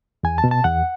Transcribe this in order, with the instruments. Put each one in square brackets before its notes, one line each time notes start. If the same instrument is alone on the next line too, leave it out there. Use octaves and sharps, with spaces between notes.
[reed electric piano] E2 G#5
A5
B2
A5
E2 F#5